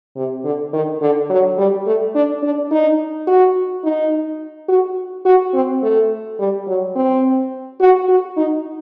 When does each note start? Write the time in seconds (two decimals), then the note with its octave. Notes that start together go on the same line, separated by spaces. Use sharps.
0.16 C3
0.44 D3
0.73 D#3
1.02 D3
1.30 F#3
1.58 G3
1.86 A3
2.15 D4
2.43 D4
2.71 D#4
3.27 F#4
3.84 D#4
4.68 F#4
5.25 F#4
5.54 C4
5.83 A3
6.39 G3
6.67 F#3
6.96 C4
7.80 F#4
8.09 F#4
8.37 D#4